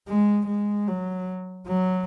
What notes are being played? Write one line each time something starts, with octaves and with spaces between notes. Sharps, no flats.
G#3
G#3
F#3
F#3